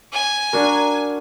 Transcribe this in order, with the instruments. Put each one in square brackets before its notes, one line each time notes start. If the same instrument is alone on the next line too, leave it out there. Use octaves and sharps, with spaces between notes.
[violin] G#5
[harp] D4 F#4 A#4